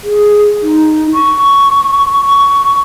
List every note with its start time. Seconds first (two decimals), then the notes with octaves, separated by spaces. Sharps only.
0.03 G#4
0.63 D#4
1.13 C#6
2.24 C#6